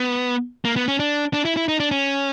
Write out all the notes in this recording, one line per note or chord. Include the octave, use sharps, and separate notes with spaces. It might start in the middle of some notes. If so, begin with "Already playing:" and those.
Already playing: B3
A#3
B3
C#4
D4
D4
E4
E4
D#4
D4
C#4